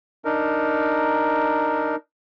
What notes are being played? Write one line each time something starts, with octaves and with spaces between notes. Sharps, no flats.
D4 D#4 A#4